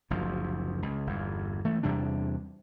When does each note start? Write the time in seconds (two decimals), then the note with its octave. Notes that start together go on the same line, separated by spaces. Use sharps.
0.10 F#1 D2 F3
0.82 C#2
1.07 G1 E2
1.64 E3 A3
1.83 E2 C3 G3 D4